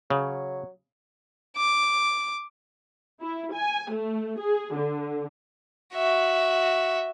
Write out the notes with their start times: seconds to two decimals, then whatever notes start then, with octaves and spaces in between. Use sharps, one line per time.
0.10 C#3 F#3
1.57 D6
3.21 E4
3.54 G#5
3.92 A3
4.39 G#4
4.75 D3
5.94 F#4 E5